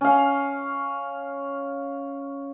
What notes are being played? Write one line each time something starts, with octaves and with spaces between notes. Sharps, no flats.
C#4 F5